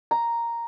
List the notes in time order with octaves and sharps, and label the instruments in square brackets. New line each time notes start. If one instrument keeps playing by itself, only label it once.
[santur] A#5